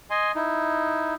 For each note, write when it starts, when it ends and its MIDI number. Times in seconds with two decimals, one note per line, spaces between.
0.11 0.32 75
0.11 0.32 80
0.11 0.32 84
0.35 1.14 63
0.35 1.14 64